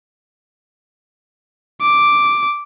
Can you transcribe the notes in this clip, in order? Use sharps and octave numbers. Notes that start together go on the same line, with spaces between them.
D6